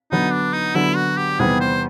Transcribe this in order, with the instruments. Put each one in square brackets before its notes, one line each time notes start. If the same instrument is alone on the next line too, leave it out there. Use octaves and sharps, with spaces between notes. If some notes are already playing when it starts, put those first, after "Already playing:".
[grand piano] D3 F#3 B3 [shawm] D#4
[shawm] D4
D#4
[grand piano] D3 F#3 B3 [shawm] E4
[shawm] F#4
G4
[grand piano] E2 C3 D#3 G3 B3 [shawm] G#4
[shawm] C5